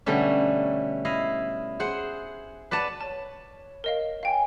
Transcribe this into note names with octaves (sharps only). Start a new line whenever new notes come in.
B2 D3 G3 A3 C#4
E4 D#5 F5
G#4 C5 F#5
B4 D5 F#5 A5
C#5 A5
A#4 D#5 F5
C#5 F5 G5 G#5